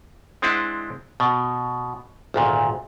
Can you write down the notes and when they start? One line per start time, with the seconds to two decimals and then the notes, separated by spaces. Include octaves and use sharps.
0.42 G#3 C4 D4 E4 D#5 F#5
1.20 B2
2.34 G#1 D2 A#2